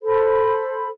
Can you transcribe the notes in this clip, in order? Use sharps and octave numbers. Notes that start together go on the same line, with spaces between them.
A4 C5 B5